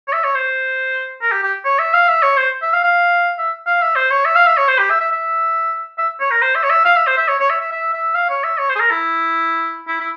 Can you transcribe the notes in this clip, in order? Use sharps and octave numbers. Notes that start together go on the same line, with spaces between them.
C#5
E5
C#5
C5
A#4
G4
G4
C#5
E5
F5
E5
C#5
C5
E5
F5
F5
E5
F5
E5
C5
C#5
E5
F5
E5
C#5
C5
G4
E5
E5
E5
E5
C#5
A#4
C5
E5
C#5
E5
F5
E5
C5
E5
C#5
C#5
E5
E5
E5
E5
F5
C#5
E5
C#5
C5
G#4
A#4
E4
E4
E4